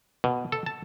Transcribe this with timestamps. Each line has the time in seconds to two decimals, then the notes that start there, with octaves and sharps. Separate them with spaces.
0.24 B2
0.52 A4
0.66 A5